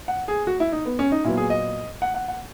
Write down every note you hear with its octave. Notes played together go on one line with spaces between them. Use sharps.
F#5
G#4
F#4
E4
D#4
B3
C#4
D#4
A#2 F#3 B3 E4
G#4
D#5
F#5
F#5
F#5